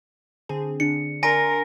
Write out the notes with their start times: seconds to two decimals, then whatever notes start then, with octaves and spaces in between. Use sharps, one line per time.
0.49 D3 C4 G#4
0.80 D3 D4 C#7
1.23 D4 A#4 G#5 A#5 C6 A#6 D7